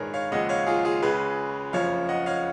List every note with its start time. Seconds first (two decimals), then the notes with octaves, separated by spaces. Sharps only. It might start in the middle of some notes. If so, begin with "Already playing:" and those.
Already playing: A#1 G#2 D#3 G#4 A#4 B4 C#5
0.14 C#5 F5
0.32 D#2 C#3 F3 G#3 D#5 F#5
0.49 C#5 F5
0.67 F4 G#4
0.85 F4 G#4
1.02 C#2 C#3 G#3 G#4 B4
1.73 F#1 F2 F3 C#5 F5
2.09 D#5 F#5
2.26 C#5 F5